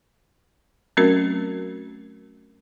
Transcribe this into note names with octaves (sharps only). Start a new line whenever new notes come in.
F#3 A3 C4 C#4 F#4 A#4